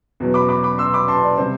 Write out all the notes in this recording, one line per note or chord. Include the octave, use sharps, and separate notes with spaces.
E2 B2 F#3
B5 D6
B5 D6
B5 D6
C6 E6
B5 D6
A5 C6
D5
C3 G3 C5